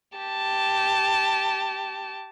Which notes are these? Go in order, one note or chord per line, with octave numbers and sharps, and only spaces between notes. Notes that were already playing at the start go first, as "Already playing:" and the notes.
G4 A5